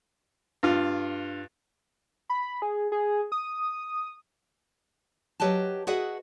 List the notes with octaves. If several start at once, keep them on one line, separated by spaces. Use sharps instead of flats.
G2 F4
B5
G#4
G#4
D#6
F#3 G4 B4 D#5 A5
F#4 G#4 B4 D#5 E5 F#5